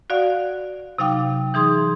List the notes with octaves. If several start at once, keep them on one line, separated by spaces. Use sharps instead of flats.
F#4 D5 F5 F#5
C3 F#3 D#4 F5 G5 D6
E3 D#4 G#4 C6 D#6